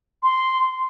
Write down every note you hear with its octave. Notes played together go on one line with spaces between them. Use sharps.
C6